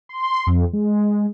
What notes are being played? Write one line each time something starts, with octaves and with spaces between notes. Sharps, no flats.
C6
F2
G#3